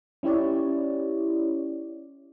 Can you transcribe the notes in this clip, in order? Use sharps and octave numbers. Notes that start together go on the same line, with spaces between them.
C#4 E4 G4 C#5 D5